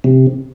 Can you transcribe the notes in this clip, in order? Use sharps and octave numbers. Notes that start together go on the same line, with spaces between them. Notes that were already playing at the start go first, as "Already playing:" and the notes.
C3